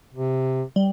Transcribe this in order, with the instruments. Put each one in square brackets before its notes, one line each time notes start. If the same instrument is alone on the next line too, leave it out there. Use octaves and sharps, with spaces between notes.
[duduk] C3
[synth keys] G3